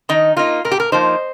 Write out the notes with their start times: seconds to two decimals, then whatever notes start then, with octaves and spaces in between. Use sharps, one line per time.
0.09 D#3 D#4
0.37 A#3 D#4 F4
0.65 A#2 A#4
0.71 G4
0.80 A#4
0.92 F3 A#3 D#4 C5